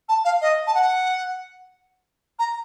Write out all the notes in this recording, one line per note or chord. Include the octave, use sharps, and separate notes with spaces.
A5
F5
D#5
A5
F#5
A#5